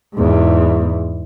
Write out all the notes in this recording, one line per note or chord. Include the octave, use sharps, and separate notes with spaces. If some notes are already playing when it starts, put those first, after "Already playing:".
E2 G#2